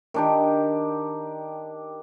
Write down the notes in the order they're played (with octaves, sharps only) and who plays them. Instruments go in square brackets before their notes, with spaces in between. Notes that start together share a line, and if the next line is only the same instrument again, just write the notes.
[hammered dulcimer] D#3 D4 G4